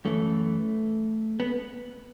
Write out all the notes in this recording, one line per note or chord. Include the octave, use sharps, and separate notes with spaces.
F#2 E3 A3
B3